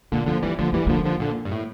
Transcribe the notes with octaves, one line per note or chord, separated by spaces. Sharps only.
A#2 D3 A#3
D3 F3 D4
E3 G3 C4
D3 F3 A#3
E3 G3 C4
D3 F3 A#3
D3 F3
A#2 D3
G2
A2